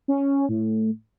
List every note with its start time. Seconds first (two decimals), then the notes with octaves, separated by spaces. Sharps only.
0.08 C#4
0.49 A2